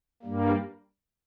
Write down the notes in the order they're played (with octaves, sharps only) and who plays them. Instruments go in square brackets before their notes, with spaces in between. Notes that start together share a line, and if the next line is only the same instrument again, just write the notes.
[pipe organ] G2 G3 A#3